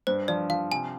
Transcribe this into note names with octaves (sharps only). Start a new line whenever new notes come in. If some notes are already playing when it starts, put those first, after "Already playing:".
G2 C5
F3 D5
F3 F5
C3 G#5